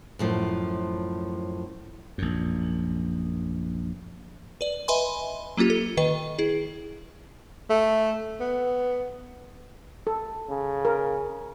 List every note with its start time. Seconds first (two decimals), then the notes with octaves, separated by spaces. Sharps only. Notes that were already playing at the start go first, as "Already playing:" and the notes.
0.19 F#2 A2 F3
2.18 A#1 F#2
4.61 B4 D5
4.88 B4 D#5 E5 G#5 B5 C6
5.57 F#3 A#3 C#4 F4 G4
5.70 A4
5.97 D#3 B4 D#5
6.39 E4 G#4
7.70 A3
8.40 B3
10.07 A4
10.49 C#3
10.85 A#4